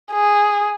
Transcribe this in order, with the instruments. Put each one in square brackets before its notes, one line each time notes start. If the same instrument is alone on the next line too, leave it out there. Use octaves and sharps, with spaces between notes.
[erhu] G#4